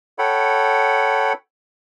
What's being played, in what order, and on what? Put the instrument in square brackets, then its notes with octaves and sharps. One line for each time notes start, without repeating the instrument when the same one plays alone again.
[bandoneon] A4 C#5 F#5 G5 B5